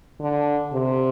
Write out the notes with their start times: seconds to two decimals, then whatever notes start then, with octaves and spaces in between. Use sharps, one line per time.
0.20 D3
0.73 C3